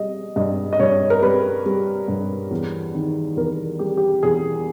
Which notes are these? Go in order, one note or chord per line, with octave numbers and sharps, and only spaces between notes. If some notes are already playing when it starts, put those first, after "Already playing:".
Already playing: G3 D#5
G2 D#5
D#5
G2 C#5
A#4
G3 B4
G3
G2
E2
D#3
E2 A#4
G3 G4
G4
E2 G#4